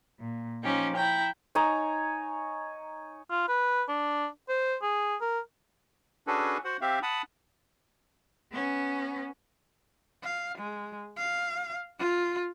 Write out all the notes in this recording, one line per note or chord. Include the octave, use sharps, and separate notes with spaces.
A#2
F3 C#4 D#4 G4
E4 G5 A#5
D#4 C#5 G#5 A#5
F4
B4
D4
C5
G#4
A#4
C#4 D4 F#4 G#4 A4 B4
F#4 C5 F#5
C4 G4 E5 F5
F#5 A5 B5 D#6
B3 C#4
F5
G#3
F5
F4